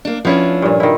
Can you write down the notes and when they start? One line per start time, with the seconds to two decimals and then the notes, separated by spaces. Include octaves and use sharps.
0.05 A#3 D4
0.25 F3 B3 C#4 D4 E4
0.62 G2 A#2
0.80 D#3 E4